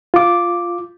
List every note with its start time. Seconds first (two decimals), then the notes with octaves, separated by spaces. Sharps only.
0.14 F4 D6